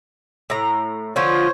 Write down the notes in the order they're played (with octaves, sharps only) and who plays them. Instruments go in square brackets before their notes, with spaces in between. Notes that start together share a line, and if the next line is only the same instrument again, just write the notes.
[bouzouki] A2 A#5
[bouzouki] D3 F3 F4 [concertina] C5 C#5